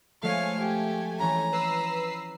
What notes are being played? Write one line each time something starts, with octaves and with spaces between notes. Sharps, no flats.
F3 G#3 A3 C4 C#5 F5 G#5
G4
E3 C#4 A#5
B4 E6 C7